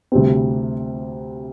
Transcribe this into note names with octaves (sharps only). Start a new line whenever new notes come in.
D2 C3 G3 C4